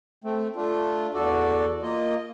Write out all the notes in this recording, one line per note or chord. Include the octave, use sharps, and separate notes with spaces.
A3 C4
A3 D4 F4
E2 F#4 A4 D5
A#3 F4 D#5